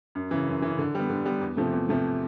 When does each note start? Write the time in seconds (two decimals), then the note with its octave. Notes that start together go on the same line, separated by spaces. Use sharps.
0.15 F#2
0.31 C#3 E3
0.47 F#2
0.62 C#3 E3
0.79 D3
0.95 G3 B3
1.10 D3
1.25 G3 B3
1.41 E2
1.57 C3 F3 A3
1.72 E2
1.89 C3 F3 A3